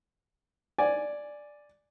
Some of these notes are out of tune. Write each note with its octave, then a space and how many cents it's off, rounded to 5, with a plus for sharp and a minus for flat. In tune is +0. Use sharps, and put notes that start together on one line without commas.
D5 +0 G#5 +0